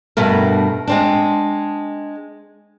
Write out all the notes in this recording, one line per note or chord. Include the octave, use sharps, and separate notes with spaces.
G2 B2 A3 A#4
G#3 C4 D4